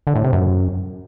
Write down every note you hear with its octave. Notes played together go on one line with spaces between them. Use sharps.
D3
A2
C3
F#2